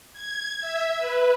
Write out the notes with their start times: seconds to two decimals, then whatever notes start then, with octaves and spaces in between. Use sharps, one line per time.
0.13 G#6
0.60 E5
0.98 B4